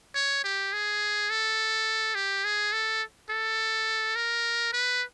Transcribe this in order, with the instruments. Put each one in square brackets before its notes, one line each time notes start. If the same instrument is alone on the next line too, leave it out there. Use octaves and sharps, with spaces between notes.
[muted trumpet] C#5
G4
G#4
A4
G4
G#4
A4
A4
A#4
B4